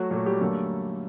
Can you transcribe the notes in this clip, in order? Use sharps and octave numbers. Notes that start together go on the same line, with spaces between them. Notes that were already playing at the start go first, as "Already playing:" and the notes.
Already playing: F#3 A3 F#4
A#2 F#3 A3 F#4
G3 G4
F#2 D3 G3 A3 A#3 A4